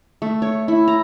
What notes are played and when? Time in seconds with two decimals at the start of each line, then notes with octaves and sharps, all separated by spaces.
0.22 A3
0.42 C#5
0.68 E4
0.88 A#5